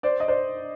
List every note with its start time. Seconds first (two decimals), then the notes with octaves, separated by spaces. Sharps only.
0.03 C5 D5
0.20 D#5
0.28 C5 D5